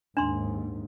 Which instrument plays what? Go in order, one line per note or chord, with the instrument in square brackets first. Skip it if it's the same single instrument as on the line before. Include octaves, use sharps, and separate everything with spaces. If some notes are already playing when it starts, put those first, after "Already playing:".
[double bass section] D#2 G#2 [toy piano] D4 C6